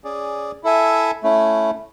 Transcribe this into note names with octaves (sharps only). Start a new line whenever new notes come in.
C#4 G#4 D5
E4 A4 E5 G#5
A3 C#4 E4